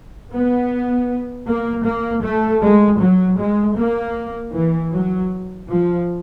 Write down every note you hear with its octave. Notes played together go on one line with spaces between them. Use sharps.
B3
A#3
A#3
A3
G#3
F#3
G#3
A#3
E3
F#3
F3